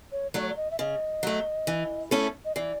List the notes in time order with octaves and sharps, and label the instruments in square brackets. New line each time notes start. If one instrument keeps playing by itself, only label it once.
[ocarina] C#5
[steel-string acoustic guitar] F#3 A3 [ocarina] D5
[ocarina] C#5
D5
D#5
E5
[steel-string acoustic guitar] C#3 [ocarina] D#5
[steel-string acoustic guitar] F#3 A3
E3
A3 C#4 E4 A4
[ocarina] D#5
[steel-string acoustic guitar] E3 [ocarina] D5